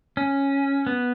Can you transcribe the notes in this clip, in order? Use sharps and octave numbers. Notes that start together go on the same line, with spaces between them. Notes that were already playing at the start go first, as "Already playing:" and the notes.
C#4
B3